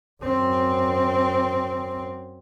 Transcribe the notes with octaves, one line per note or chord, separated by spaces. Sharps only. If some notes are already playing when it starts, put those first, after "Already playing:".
F#2 C4